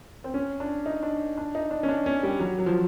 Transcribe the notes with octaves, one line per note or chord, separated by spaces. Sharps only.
C4
C#4
D4
D#4
D4
D4
D#4
D4
C#4
D4
C#4
G3
F#3
F#3
F3